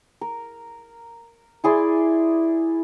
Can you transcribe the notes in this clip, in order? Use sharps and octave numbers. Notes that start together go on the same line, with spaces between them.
A#4
E4 G#4 D5 C6